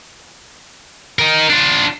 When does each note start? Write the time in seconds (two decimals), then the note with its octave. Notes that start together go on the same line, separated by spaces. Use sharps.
1.19 D#4 A#4
1.50 D4 F4